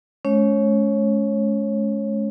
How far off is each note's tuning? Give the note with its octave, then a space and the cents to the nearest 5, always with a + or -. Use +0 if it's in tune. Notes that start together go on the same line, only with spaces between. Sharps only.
G#3 +45 C#4 +15 C#5 -20